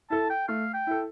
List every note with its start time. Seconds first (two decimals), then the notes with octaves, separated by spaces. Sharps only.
0.10 E4 A4 A5
0.30 G5
0.48 A3 F5
0.74 G5
0.87 E4 A4